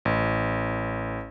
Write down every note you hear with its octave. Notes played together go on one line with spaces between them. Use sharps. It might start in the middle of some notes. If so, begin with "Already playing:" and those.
A1